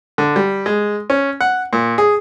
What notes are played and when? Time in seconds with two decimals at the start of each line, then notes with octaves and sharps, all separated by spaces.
0.18 D3
0.36 G3
0.66 G#3
1.10 C#4
1.41 F#5
1.73 A#2
1.98 G#4